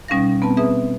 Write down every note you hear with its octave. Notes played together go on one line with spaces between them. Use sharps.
B2 G3 C#4 D#4 F5 A#6
B3 C4 B4 A5
G#4 B4 E5 D#6